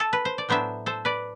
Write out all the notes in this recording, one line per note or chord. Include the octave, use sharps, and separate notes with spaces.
A4
B4
C5
D5
A2 F#3 B3 D4 C5 E5
A4 C5
B4 D5